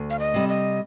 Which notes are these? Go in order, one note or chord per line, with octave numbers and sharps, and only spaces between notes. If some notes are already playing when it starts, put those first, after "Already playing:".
Already playing: D2
F5
D#5
C3 G3
D#5